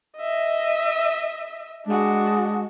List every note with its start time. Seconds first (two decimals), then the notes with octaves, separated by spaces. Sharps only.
0.17 D#5 E5
1.86 G#3 D4 F#4